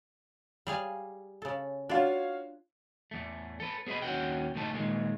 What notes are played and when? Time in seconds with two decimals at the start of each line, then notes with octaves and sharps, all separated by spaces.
0.67 G3 G#4 F5
1.42 C#3 A4
1.89 D4 F4 F#4 C#5 F5
3.11 E2 A3
3.60 A4 B4
3.87 B3 G#4 B4 D#5 B5
4.02 D#2 C#3 C#4 F#4 F#5 G5
4.55 D2 A2 E3 A3 D#4 A5
4.74 A#2 D#3 G#3